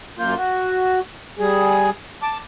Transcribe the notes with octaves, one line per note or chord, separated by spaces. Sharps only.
F#2 A#3 F4 G6
F#4
G3 G#4
A5 D6